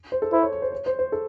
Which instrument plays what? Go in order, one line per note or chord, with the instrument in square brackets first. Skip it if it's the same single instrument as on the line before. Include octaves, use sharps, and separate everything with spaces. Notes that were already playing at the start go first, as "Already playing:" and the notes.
[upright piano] C5
A4
[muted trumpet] E4 [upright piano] C5
[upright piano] C#5
C#5
C5
C#5
C5
C5
A4